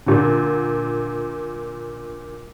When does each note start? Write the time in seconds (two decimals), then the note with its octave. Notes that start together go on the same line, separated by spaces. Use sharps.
0.06 A#2 D3